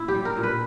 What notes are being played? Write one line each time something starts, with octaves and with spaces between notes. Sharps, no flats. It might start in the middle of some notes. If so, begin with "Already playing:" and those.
Already playing: A#2 D4 E4
G4
G3
A#4
A#2
B4